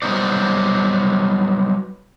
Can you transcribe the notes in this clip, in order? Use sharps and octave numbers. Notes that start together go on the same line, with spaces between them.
F#3 G3 B3 D#4 C5 D5